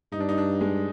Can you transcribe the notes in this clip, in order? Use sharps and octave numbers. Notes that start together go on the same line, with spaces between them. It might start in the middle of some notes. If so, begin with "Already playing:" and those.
G2 D#4
D4
D#4
D4
G#3